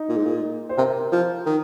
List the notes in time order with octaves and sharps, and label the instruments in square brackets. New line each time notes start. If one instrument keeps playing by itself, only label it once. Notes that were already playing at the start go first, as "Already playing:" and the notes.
Already playing: [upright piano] D#4
[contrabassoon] A#2
G#2
A#2
[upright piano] C5
[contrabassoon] C3 [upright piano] A#4
[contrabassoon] F3
D#3